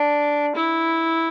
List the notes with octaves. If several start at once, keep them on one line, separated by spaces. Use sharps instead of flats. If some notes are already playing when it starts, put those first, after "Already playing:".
Already playing: D4
E4